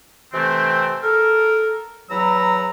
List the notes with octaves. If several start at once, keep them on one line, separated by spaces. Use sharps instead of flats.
C3 E3 A3 C4
A4 A#4
E2 F#3 A#5 B5 E6